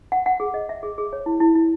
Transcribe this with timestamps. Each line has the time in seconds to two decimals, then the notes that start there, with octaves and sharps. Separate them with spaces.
0.12 F#5
0.26 F#5
0.40 G#4
0.54 D#5
0.69 E5
0.83 G#4
0.98 G#4
1.13 C#5
1.26 E4
1.40 E4
1.55 E4